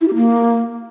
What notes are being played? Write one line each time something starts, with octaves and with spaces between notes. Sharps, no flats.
E4
G4
A#3